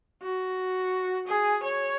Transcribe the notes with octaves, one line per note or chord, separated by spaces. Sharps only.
F#4
G#4
C#5